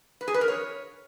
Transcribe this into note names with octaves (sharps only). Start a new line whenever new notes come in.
B4
G#4
B4
A#4
C#5